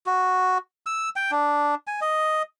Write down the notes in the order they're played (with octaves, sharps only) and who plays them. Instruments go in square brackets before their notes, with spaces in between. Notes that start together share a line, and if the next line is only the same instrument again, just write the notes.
[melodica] F#4
E6
G5
D4
G#5
D#5